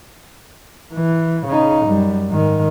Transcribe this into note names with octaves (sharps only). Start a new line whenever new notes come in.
E3
C#3 D#4
F#2 G3
G#2 D#3